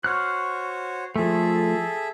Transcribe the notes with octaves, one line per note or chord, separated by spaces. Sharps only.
F#4 C5 C#5 C#6 F6 F#6
F3 A3 G#4 A4 E5